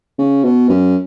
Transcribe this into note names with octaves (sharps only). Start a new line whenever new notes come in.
C#3
B2
F#2